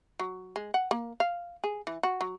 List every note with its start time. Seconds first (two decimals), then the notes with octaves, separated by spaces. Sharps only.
0.19 F#3
0.56 G#3
0.74 F#5
0.91 A#3
1.20 F5
1.64 G#4
1.87 E3
2.03 F#4
2.21 F#3